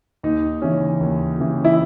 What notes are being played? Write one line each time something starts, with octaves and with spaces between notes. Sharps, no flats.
D#2 D#4
C#3 E3 C#4
D#2
C#3 E3
E4